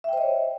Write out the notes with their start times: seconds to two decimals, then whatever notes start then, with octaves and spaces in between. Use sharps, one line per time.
0.04 E5
0.09 G5
0.13 C5
0.17 D#5
0.22 C#5